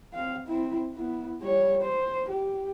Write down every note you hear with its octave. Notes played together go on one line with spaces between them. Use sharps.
C4 F5
C4 E4
B3 E4
G3 C#5
C5
G4